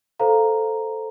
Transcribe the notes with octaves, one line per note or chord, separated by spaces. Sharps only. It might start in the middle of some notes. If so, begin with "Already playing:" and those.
A4 C5 F5 A#5